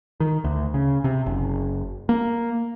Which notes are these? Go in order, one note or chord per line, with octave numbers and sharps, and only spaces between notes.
D#3
D2
C#3
C3
F#1
A#3